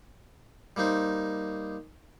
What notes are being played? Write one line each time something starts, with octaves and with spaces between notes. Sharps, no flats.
G3 A#3 D#4 C5